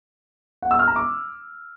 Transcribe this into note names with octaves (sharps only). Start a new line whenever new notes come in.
F#5
E6
F6
A#5
D6